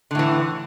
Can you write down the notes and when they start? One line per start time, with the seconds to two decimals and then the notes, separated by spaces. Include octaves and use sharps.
0.11 D3
0.15 A2
0.19 E3